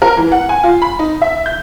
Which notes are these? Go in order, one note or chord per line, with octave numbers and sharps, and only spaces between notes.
A#4
E3
F#5
G#5
F4
B5
D#4
E5
G6